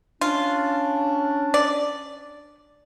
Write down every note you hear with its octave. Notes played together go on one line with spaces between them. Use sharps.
C#4 D4 F4
D5